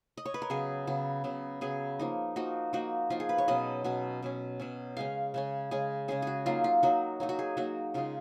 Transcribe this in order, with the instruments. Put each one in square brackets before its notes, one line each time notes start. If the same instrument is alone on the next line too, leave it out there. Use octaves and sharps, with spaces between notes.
[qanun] D#5
C#5
B4
A#4
C#3 F#3 B3 G#4
C#3 F#3 B3
C#3 F#3 B3
C#3 F#3 B3 G#4
F3 A#3 D#4
F3 A#3 D#4 F#4
F3 A#3 D#4 F#4
F3 A#3 D#4 F4
G#4
B4
C#5
B2 F#3 C#4 D#5
B2 F#3 C#4
B2 F#3 C#4
B2 F#3 C#4
C#3 G#3 C#4 F5
C#3 G#3 C#4
C#3 G#3 C#4 G#4
C#3 G#3 C#4 G#4
F#4 G#4
F#3 A#3 D#4 F4
F4
F#3 A#3 D#4 F#4
F#3 A#3 D#4
F#4
G#4
F#3 A#3 D#4 F#4
C#3 G#3 D#4 F4